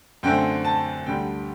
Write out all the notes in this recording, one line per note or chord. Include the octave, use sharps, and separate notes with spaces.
F#2 D3 A3 C4 G5
A5
D2 D3 G3 G5